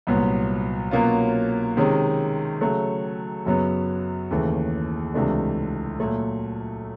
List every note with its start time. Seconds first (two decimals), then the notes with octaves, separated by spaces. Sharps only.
0.07 C2 A#2 F#3 B3
0.91 B2 F#3 A#3 C#4 F4
1.77 C3 D#3 G#3 C#4
2.61 C#3 F#3 A3
3.46 F#2 C#3 F#3 B3
4.31 D#2 C#3 E3 A3
5.14 C#2 C3 E3 A3 D4
6.00 A#2 F#3 A3